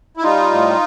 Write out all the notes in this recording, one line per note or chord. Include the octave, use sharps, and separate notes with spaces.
E4
G3 D#4 F4
A2